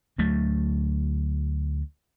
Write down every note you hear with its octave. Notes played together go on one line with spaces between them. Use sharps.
D2 F#3 A3